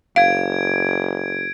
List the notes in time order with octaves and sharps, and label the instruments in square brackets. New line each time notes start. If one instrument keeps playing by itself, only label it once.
[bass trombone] F#1 [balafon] F5 [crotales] G#6 D7